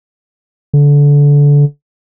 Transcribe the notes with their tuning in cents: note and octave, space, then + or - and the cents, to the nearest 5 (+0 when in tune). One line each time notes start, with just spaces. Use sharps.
D3 -25